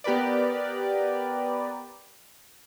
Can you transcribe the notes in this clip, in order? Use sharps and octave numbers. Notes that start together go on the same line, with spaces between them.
B3 G4 A#4 B4 D5